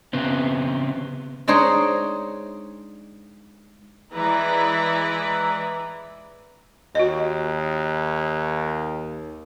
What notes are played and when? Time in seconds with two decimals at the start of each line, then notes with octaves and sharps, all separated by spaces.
0.13 C#3 B3 C4
1.48 G#3 D4 D#4 C5 C#5 D#5
4.14 E3 G#3 E4 B4 D5 A#5
6.95 D#2 F#4 D#5